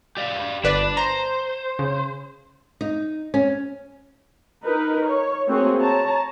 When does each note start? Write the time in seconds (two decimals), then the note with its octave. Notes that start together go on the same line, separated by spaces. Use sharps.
0.17 G4 D5 F5
0.64 G1 D4 B4 D5
0.97 C5 A#5
1.79 C#3
2.81 D#4
3.34 C#4
4.64 D#4 A#4 B4
5.04 C#5
5.47 A3 A#3 C4 F#4 G#4 C#5
5.82 C#5 A5 A#5